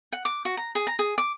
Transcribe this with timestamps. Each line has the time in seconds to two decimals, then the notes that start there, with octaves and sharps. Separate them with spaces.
0.12 F#5
0.25 D6
0.45 F#4
0.57 A#5
0.75 G#4
0.87 A#5
0.99 G#4
1.18 D6